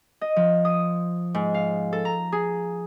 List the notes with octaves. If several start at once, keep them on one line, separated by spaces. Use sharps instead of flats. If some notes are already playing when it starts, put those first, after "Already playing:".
D#5
F3
D#6
G#2
F5
A4
A#5
G#4